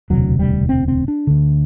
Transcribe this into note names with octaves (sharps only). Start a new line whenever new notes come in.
E1 D2 C3 F#3
G3
C4
C4
D4
D2 D3